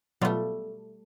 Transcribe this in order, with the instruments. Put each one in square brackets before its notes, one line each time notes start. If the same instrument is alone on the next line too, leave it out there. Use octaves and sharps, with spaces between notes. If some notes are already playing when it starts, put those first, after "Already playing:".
[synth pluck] B2 F#3 F4 [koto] G3 A3